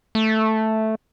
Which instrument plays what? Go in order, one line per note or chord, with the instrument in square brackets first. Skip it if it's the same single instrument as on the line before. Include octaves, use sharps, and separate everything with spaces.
[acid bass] A3